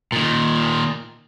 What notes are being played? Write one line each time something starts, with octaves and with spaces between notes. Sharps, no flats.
A#2 D#3